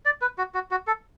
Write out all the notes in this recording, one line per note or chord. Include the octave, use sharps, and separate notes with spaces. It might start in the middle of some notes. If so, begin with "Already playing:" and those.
D5
B4
F#4
F#4
F#4
A4